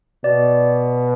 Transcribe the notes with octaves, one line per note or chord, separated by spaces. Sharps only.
B2 D5